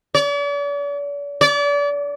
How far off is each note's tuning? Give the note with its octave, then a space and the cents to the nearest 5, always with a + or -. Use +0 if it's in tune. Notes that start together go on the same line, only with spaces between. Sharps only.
D5 -45
D5 -35